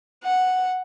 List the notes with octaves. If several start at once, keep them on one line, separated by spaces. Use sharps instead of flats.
F#5